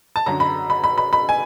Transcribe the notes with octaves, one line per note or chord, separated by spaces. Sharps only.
A5
F#2 D3 F#3 A#5
B5
B5
B5
B5
B5
G#5